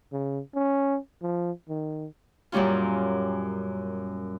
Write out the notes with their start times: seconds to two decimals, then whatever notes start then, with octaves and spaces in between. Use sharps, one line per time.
0.13 C#3
0.55 C#4
1.22 F3
1.69 D#3
2.52 F#2 A#2 G3 C#4 F4